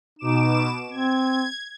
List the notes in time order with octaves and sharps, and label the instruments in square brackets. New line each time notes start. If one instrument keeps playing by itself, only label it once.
[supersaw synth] B2 D6 E7 [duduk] D#4
[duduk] C4 [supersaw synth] G#6